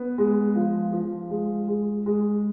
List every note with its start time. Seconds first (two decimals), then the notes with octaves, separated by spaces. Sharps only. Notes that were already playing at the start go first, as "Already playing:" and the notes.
Already playing: B3
0.18 G#3
0.55 F3
0.92 F3
1.30 G#3
1.68 G#3
2.06 G#3